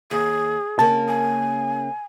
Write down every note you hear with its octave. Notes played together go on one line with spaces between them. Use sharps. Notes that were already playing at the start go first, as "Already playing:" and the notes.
D#2 G#4
C#3 A#3 A5
G#5